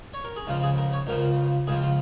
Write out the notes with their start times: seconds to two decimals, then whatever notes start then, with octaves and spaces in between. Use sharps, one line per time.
0.13 C#5
0.24 A#4
0.36 G#4
0.47 C#2 C#3 F3 F4
0.63 G#4
0.77 A#4
0.93 C#5
1.07 C#2 C#3 F3 A#4
1.67 C#2 C#3 F3 G#4
1.82 F4